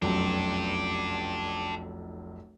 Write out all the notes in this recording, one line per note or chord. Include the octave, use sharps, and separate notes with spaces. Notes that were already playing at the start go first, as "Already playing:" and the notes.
F1 B1 F#2 D4 G4